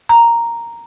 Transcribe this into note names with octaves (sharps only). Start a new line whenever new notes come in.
A#5